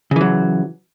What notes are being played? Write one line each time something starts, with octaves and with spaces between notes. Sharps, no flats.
C#3 E3 F#3